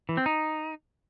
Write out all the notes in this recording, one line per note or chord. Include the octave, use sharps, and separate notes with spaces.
E3
C4
D#4